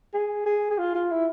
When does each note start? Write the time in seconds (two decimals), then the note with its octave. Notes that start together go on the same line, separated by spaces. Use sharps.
0.14 G#4
0.46 G#4
0.70 G#4
0.78 F4
0.95 F4
1.11 E4